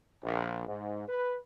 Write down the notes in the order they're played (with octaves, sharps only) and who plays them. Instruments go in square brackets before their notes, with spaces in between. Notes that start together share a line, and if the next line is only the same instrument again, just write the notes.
[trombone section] A#1
G#2
B4